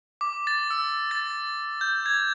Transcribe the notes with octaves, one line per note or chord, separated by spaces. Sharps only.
D6
A6
E6
A6
G6
G#6